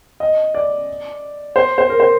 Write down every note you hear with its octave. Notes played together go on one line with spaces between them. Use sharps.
D#5
D5
C5
C5
A#4
C5